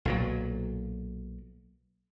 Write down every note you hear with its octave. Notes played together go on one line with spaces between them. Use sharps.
B1 A#2 F#3